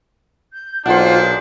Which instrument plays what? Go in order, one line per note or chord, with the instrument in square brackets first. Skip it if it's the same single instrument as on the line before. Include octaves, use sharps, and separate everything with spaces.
[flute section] G6
[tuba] B1 [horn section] A#2 G#3 D4 [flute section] F4 [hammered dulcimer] C5 F#5